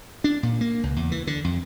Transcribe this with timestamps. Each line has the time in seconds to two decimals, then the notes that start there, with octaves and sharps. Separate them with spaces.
0.24 D4
0.43 A#2
0.61 A#3
0.83 C#2
0.96 E2
1.12 E3
1.27 D3
1.44 F2